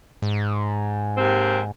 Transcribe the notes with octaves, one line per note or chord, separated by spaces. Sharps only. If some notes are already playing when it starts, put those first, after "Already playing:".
G#2
D#2 C3 C4